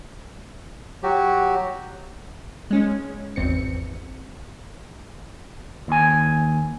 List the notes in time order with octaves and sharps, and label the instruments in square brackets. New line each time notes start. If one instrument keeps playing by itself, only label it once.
[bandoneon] F#3 F#4 G4
[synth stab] G#3 C#4
G#1 E2 C4 C#7
[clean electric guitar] D#2 G#5